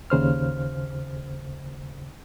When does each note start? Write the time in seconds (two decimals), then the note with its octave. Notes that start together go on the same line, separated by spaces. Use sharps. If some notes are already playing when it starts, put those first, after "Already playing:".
0.10 D#2 C#3 C5 F6